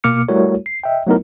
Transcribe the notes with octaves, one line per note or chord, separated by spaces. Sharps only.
B2 A#3 D6 F6 C#7
G3 A3 E4 F#4 A#4 C#5
C7
D#5 E5 G5
F#3 A3 B3 D#4 E4 A#4